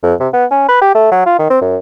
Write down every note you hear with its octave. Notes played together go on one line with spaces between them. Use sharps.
F2
C3
B3
C#4
B4
G4
A3
F#3
F4
D#3
C4
F#2